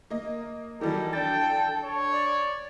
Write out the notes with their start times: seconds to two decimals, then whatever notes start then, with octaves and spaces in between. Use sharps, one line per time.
0.10 A#3 D#5
0.81 D#3 E3 F#3 G3 A4
1.13 D4 G5 A6
1.84 C#5
2.14 D5